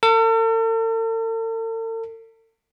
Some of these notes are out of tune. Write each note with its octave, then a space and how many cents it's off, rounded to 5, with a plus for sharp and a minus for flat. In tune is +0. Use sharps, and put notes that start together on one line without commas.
A4 +45